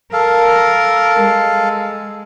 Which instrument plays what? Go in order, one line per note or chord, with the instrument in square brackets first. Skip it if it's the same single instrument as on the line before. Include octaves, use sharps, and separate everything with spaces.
[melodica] A4 F5 [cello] A#4
[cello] G#3